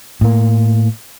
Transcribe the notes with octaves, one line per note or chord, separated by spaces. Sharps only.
A2 A#3